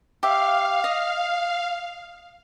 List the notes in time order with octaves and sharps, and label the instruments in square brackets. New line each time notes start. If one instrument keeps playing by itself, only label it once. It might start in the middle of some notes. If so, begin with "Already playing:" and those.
[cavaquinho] G4 E5 [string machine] F5
[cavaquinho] D#5